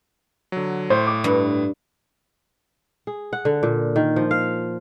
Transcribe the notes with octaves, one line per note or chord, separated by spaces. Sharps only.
D3 F#3
A2 C5
D6
G2
G#4
F#5
D3
A#2
D#3
F3
F5